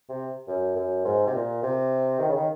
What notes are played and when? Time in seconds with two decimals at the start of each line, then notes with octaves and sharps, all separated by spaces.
0.09 C3
0.47 F#2
0.76 F#2
1.04 G#2
1.26 C3
1.33 A#2
1.63 C3
2.19 D#3
2.28 C#3
2.36 D#3